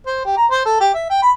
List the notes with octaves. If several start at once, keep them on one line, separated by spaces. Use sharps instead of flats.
C5
G4
A#5
C5
A4
G4
E5
G5
B5